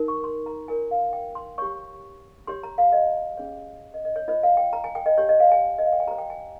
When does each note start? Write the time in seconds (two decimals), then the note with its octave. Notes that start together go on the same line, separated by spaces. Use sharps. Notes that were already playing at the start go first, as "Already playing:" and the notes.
Already playing: D#4 A#4
0.08 C#6
0.24 C6
0.46 A#5
0.68 F4 A#4 C#5 G#5
0.91 F5
1.13 G5
1.35 C6
1.58 G4 C#5 C#6
2.47 G4 C#5 C6
2.63 A#5
2.78 F5
2.92 D#5
3.38 C#4 G#4 C#5
3.94 D#5
4.05 D#5
4.16 C#5
4.28 F4 C5 D#5
4.43 F5
4.57 G5
4.73 A#5
4.84 G#5
4.95 G5
5.06 D#5
5.18 G4 C#5
5.29 D#5
5.40 F5
5.52 G#5
5.79 D#5
5.86 F5
5.93 G5
6.00 G#5
6.07 G4 C5 A#5
6.18 G5
6.30 G#5